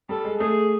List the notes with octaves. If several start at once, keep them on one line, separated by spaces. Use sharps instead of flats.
G3 A4
G#3
A3 G#4